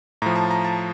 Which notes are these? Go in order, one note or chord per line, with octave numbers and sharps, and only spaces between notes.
A2 F3 A#5
A5
A#5
A5